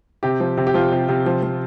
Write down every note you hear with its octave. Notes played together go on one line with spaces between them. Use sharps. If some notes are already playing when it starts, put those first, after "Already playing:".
C3 G4
F3
C3
G4
F3 F4
C3
C3
F3
F3